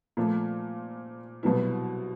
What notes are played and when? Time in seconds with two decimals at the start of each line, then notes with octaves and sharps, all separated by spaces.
0.17 A#2 F3 A3
1.43 C2 B2 F#3 B3 E4